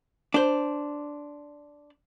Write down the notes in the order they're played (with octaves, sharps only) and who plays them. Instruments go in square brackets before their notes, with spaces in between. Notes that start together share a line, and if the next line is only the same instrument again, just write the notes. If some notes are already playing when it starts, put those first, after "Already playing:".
[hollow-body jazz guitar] D4 C5